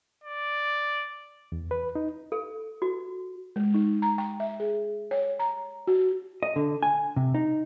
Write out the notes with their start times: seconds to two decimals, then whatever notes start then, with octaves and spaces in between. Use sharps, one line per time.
0.24 D5
1.52 E2
1.71 B4
1.95 D#4
2.32 A4
2.82 F#4
3.56 G#3
3.74 D#4
4.02 A#5
4.18 G5
4.40 E5
4.60 G#4
5.11 C#5
5.39 A#5
5.87 F#4
6.43 D#5
6.56 D3
6.82 G#5
7.16 C3
7.35 D#4